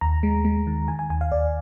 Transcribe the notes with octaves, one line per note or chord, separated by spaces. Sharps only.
D#2 A#5
G#3
G#3
D#3
D#3 G#5
G#5
D#2 G#5
F5
D#2 D5